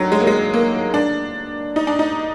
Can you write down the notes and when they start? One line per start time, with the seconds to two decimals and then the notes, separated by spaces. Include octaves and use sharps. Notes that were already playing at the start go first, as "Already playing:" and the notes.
Already playing: D3 D#3 F#3
0.12 G#3
0.20 A#3
0.27 G#3
0.54 A#3
0.94 D4
1.76 D#4
1.87 D4
1.99 D#4